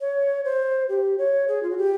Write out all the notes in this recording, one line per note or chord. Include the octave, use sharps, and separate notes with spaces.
C#5
C5
G4
C#5
G#4
F4
F#4
G4